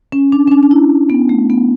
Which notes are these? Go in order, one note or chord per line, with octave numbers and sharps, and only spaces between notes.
C#4
D4
C#4
D4
D4
E4
B3
A3
B3